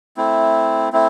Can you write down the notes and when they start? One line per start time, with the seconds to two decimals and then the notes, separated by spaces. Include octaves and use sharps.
0.17 A3 C4 E4
0.93 A3 C4 E4